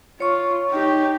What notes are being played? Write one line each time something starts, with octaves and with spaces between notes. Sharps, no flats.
F4 C#5 C#6
D#4 G4